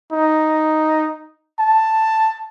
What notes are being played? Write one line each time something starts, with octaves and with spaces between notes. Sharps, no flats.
D#4
A5